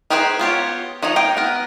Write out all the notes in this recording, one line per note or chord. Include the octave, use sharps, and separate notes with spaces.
D#4 G4 G#4 B4 C5
B3 F4 G4 C#5
F3 D#4 C#5 D#5
D#4 G5
B3 A#4